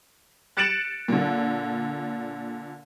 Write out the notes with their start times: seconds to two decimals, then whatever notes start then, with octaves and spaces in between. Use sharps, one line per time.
0.57 F#6 A6 C#7 D7 E7 F#7
1.08 A#2 D3